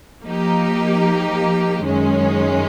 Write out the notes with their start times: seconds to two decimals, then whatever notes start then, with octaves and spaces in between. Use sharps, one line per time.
0.23 F3 A#3 D#4 G4
1.84 F#2 D#3 G#3 C#4